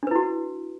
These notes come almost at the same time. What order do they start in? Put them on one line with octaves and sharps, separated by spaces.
D4 B4 E4 F#4